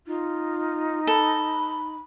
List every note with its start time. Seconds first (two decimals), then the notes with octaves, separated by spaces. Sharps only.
0.07 D#4 F4
1.07 A4 B5